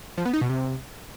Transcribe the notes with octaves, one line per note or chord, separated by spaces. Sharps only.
F3
B3
D#4
B2
C3